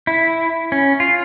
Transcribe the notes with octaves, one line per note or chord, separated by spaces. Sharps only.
E4
C#4
F4